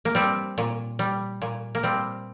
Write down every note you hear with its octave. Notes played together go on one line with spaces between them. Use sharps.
A#3
G3 C4
A#2
G3
A#2
A#3
G3 C4